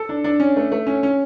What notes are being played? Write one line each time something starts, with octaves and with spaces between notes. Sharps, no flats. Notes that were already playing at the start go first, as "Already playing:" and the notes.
Already playing: A4
D4
D4
C#4
A3
A3
C#4
C#4